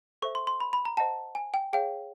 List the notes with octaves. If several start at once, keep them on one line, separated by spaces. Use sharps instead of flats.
A4 C5 E5 C#6
C6
C6
B5
B5
A#5
C5 D#5 F#5 A5
G#5
G5
G#4 C#5 F5 G5